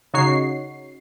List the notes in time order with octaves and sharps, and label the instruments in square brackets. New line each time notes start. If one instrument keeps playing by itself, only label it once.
[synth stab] C#3 D#4 F#4 C#5 C7